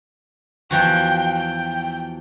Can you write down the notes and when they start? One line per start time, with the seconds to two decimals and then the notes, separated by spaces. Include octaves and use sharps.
0.71 E2 F3 F#4 G5
1.39 G5